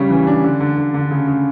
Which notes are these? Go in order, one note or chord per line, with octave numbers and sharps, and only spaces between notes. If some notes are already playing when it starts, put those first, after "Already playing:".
Already playing: C#3 G3 C#4
E3
D4
D3
D3
D3
D3
C#3
C#3